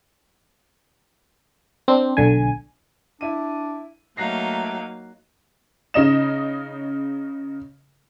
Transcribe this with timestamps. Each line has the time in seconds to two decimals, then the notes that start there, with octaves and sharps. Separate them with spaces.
1.88 C4 D4
2.17 B1 D3 G#5
3.21 D4 E4 D#7
4.17 F#3 A3 A#3 D#4 F5 F#6 A#6 C7
5.94 C#3 D#4 D#5 E7